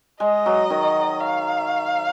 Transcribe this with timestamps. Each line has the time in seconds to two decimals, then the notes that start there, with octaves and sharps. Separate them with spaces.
0.20 G#3 D#5
0.46 F#3
0.70 D#3
1.20 F5